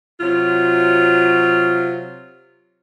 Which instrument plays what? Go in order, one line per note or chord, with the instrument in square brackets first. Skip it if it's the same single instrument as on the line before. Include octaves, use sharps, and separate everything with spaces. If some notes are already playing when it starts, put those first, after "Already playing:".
[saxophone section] C3 F#3 F4